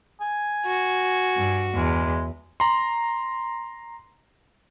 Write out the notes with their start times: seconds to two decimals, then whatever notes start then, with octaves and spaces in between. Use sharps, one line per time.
0.21 G#5
0.66 F#4
1.37 G2
1.74 E2 G#3
2.60 A#5 C6